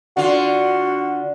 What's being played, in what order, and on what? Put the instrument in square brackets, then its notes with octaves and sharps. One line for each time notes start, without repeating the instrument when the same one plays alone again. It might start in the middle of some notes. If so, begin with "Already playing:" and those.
[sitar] D3 F4 [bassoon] F#4